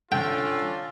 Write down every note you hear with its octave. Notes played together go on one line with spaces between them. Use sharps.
C#4 D4 F4 A4 G5